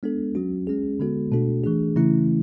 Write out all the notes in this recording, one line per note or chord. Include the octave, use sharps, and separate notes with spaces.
G#3 B3 D4 A4
F#3 C#4 F#4
G#3 C#4 G#4
D3 G#3 B3 F#4 A4
B2 A3 D4 F#4 A4
E3 A3 D4 G#4
C#3 E3 A3 C#4 E4